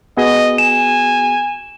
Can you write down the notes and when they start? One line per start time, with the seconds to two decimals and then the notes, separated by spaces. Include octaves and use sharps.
0.17 B3 F#4 G#4 D#5
0.58 G#5 E7